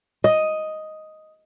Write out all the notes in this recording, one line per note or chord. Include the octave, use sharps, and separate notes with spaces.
D#5